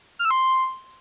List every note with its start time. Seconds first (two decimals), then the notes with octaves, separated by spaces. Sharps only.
0.19 F6
0.25 E6
0.31 C6